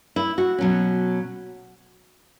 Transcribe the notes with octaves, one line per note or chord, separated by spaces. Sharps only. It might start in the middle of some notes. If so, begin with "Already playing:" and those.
E4
F#4
B2 F#3 C#4